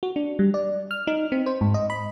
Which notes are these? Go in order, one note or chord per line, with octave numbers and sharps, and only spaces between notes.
F#4
D4
G3
D5
F6
D#4
C4
C5
G#2
D#5
B5